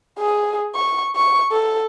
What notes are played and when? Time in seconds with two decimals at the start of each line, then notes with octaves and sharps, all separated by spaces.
0.19 G#4
0.75 C#6
1.16 C#6
1.52 A4